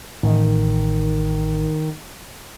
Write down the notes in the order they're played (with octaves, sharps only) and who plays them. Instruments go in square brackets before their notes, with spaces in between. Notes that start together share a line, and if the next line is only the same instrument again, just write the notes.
[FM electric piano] A1 [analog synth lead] D#3